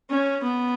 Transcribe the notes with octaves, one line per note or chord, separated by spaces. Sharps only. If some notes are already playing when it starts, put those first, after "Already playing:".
C#4
B3